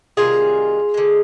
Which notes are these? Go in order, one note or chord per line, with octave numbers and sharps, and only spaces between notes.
C3 D#3 G3 F4 G#4
D3 G#3